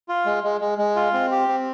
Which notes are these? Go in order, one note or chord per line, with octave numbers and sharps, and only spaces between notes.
F4
G#3
G#3
G#3
G#3
F4
C4
G4
C4